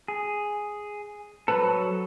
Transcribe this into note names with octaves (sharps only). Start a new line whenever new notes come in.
G#4
F#3 A4 B4